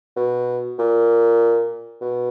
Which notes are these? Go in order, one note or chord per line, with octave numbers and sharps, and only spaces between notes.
B2
A#2
B2